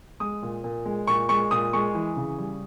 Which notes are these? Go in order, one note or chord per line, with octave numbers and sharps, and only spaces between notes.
G#3 D#6
A#2
A#2
G#3
A#2 C#6
G#3 C#6
A#2 D#6
G#3 C#6
E3
C#3
G3